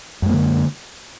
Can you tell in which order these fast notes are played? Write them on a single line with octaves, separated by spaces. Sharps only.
F#2 G#3 A#3 D3